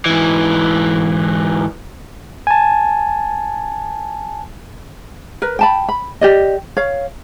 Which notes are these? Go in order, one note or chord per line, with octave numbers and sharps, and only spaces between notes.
G#2 E3
G#5 A5
A#4 B4
G5 A5 B5
B5
G4 D5 D#5
C#5 F5